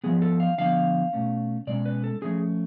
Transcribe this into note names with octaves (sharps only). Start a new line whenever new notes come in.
F3 B3 G#4
A4
F5
D3 F3 B3 F5
B2 A3 C#4
B2 G#3 C#4 D5
B4
A4
F3 A3 C#4 G#4